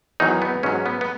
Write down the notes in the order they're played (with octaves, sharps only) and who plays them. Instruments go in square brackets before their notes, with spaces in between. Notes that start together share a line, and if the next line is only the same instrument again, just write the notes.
[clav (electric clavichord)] E2 D#3 F#3 D#4
B3
G#2 F#3 C#4
B3
B3